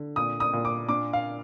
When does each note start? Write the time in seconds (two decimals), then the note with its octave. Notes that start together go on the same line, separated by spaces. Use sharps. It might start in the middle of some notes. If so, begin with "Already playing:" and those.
Already playing: D3
0.16 A#2 D#6
0.40 D#6
0.53 A#2
0.65 D6
0.89 D4 D6
1.13 F5